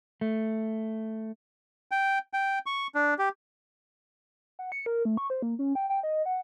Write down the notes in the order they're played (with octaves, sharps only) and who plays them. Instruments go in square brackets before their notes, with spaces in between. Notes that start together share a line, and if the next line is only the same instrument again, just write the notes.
[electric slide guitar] A3
[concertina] G5
G5
C#6
D4
G4
[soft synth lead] F#5
C#7
A#4
A3
C#6
C5
A#3
C#4
G5
G5
D#5
F#5